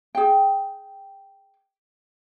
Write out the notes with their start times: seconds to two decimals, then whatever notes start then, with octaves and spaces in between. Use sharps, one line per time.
0.15 G#4 G5